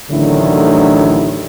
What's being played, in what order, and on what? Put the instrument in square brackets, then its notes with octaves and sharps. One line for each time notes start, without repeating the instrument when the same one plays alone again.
[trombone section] A1 D2 D3 D#3 F#3 E4